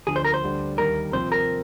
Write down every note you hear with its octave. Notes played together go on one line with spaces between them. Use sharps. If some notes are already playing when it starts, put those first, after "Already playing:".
D2 D3 F3 G#4
C5
A#4
C5
D2 D3 G3 D4
D#2 D#3 G3 A#3 A#4
C3 F3 C4 C5
A#4